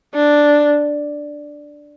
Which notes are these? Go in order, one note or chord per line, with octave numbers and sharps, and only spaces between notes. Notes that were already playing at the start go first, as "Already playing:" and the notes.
D4